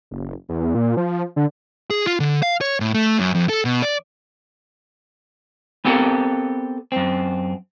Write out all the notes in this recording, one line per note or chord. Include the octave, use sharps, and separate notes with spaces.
F#1
E2
A#2
F3
D3
G#4
F4
D3
F5
C#5
A2
A3
F#2
F2
A4
B2
D5
B3 C4 G4 A4 A#4
F#2 C4